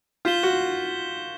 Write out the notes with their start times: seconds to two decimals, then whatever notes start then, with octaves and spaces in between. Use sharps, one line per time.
0.25 F4 G6 B6 E7 G7
0.43 F#4